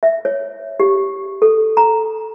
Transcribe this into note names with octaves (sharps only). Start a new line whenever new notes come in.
E5
C#5
G4
A4
A#5